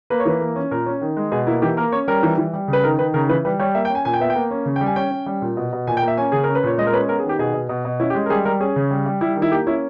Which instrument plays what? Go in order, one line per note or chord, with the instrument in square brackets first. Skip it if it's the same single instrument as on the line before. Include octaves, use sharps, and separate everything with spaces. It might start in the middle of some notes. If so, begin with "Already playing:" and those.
[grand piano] A#3 B4
C#5
E3 B4
A#3
C#4
A#2 A#4
C#4
D#3
G#3
B2 G#4
A#3 E4
E3 G4
A#3 A#4
C#4 C#5
G3 A#4
E3
E3
G3
C#3
B4
D#3 A#4
D#3 B4
C#3 A#4
E3 B4
G3 B4
G3 C#5
A#3 E5
G5
C#4 G#5
A#2 G#5
G5
B3 E5
G5
A#3
C#4
C#3
G5
G3
G#5
C#4 G5
C#4
G3
A#2
B2
B2
A#2 G#5
G5
A#3
E5
C#4 G#5
C#3 G#4
C#4 A#4
B4
A#2 C#5
G#3 D#5
A#4
C#4 B4
B3 A#4
G#4
D#3
G4
B2 G#4
B2
B2
B2
C#4 E4
G4
G#3
A#4
G3 G#4
G3 A#4
C#4 G#4
C#3
G3
G3
G3 E4
D#3
E4
A#3 G4
C#4 E4